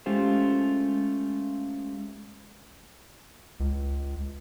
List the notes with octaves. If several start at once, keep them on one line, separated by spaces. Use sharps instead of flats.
G#3 A3 C#4 F4 G4 C5
C#2